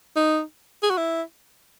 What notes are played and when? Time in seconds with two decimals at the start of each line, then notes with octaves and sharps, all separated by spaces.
0.16 D#4
0.83 G#4
0.90 F#4
0.97 E4